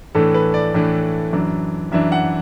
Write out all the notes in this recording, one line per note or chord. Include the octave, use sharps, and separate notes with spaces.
A2 E3 A3 D4 A4
B4
D5
A2 E3 A3 D4
F#2 E3 D4
F#2 E3 D4 E5
F#5